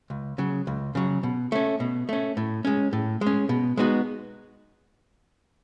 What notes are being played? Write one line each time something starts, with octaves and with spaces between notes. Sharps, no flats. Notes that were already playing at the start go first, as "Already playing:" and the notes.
C#2
C#3 F#3
C#2
C#3 F#3
B2
A3 C#4
B2
A3 C#4
A2
G#3 C#4
A2
G#3
C#4
B2
G#3 B3 D#4 F#4